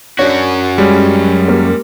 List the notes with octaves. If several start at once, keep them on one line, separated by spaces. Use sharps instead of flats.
F#2 D4 F#4 C#5
G3 G#3 C#4
A#3 G4 A#4